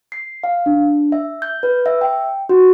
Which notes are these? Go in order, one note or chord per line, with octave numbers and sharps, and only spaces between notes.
C7
F5
D4
E5
G6
B4
E5
G5
F#4